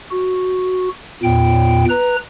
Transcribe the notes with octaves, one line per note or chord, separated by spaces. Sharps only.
F#4
E2 A#2 G5
B4 A#5